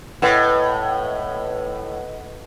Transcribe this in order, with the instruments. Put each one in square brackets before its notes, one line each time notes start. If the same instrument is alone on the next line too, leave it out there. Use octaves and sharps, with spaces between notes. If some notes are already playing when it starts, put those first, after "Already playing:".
[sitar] A2 [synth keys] B4 D#5 F#5